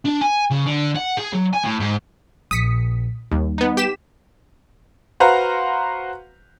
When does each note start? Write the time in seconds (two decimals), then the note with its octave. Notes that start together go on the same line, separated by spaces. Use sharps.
0.06 D4
0.21 G#5
0.51 C#3
0.66 D3
0.96 F#5
1.17 G#4
1.33 F#3
1.54 G#5
1.65 A2
1.80 G#2
2.51 A#1 D#6 B6 C#7
3.31 D#2 G3
3.58 B3 D#4
3.77 G4 B6 E7
5.20 F#4 B4 C5 F5 F#5 A#5